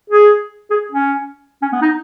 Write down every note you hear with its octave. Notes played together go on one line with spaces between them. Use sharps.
G#4
G#4
C#4
C#4
B3
D#4